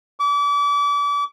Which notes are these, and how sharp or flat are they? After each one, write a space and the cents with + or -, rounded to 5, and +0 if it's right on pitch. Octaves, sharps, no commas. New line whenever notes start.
D6 -35